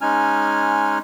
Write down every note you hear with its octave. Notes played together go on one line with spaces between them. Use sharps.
G#3 C#4 D#4 G#5 F6